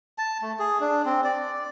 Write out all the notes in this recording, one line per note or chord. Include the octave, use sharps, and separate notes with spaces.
A5
A3
G#4
D4
C4
D5